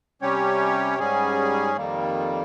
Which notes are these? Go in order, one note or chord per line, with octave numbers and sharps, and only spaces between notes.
C3 G3 C#4 G4 C#5
G#2 G3 C#4 G#4
F2 D#3 G3 A#3